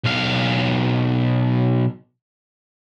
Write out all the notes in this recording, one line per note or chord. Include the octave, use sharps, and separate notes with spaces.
B1 F5